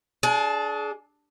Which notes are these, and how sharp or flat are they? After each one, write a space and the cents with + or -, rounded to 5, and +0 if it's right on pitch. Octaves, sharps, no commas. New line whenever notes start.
D4 -10 G#4 +30